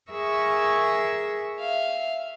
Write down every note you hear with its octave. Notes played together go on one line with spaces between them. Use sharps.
G#4 A#4 E5 C#6 E6
E5 F5